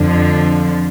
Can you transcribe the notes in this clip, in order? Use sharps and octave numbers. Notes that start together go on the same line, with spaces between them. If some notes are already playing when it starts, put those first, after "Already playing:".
Already playing: F2 D3 F3